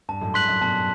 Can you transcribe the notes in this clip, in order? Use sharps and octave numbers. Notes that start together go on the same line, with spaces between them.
G2 A5
F#2 A2
G2 C6 F#6 B6 F#7
F#2
G2 B2 A5